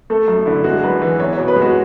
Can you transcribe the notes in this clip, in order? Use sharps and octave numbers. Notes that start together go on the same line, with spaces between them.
A3 A4
F#2
D3 E4
G#3 F#4
F#2 B4
E3
B3 C#5
C#5
B2
B4
G#3
F#4